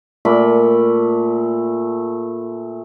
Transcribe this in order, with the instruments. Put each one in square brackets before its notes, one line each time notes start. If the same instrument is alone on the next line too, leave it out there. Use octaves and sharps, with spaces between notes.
[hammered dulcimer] A#2 A3 B5